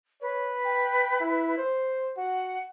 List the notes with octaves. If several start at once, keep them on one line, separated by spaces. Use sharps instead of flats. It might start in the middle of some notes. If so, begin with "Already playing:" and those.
B4 C#5
G5
E4
C5
F#4 F#5